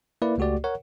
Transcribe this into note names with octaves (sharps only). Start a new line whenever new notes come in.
A#3 E4 B4 D5
C#2 A3 F#4 G4 D5
A#4 C#5 F#5